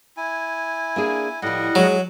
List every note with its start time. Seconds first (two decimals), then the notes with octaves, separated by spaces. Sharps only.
0.17 E4 G#5
0.96 A#3 D4 G#4
1.42 A2 F3 G3 D#5 F#5
1.75 F#3 G#3 G#4